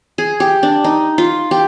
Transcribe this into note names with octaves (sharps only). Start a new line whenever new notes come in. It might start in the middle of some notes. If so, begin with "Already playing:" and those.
G#4
G4
D4
D#4
F4
G4